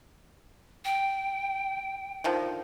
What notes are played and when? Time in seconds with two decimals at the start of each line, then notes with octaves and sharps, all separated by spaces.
0.85 G5
2.24 D3 D#3 F3